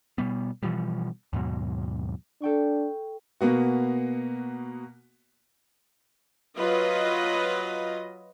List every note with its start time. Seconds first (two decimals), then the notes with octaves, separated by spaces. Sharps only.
0.18 B2 G3 B3
0.63 B2 E3 F3 G3
1.33 D#2 G#2 B2 F#3
2.42 D4 A4 G5 C#6
3.41 B2 A#3 B3 F#4
6.57 F#3 F4 B4 D#5